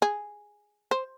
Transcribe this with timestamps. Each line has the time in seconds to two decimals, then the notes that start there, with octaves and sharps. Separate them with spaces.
0.02 G#4
0.91 C5